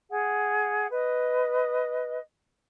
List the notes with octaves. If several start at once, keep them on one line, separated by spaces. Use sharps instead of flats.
G#4 F#5
B4 D#5